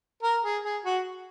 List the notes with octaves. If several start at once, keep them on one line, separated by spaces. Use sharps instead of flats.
A#4
G#4
G#4
F#4